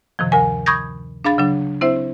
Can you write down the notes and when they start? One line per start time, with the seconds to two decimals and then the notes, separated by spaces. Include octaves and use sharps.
0.19 F#2 C3 D#3 F3
0.32 D2 A#4 G#5
0.66 B5 C#6 D#6 G6 G#6 A#6
1.25 D4 G#4 F5 B5 A6
1.38 C#3 F#3 D4
1.81 C4 E4 C5 E5